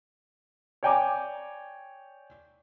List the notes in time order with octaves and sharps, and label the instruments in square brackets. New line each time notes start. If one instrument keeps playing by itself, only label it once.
[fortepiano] C#5 D5 G5 G#5 A#5 D6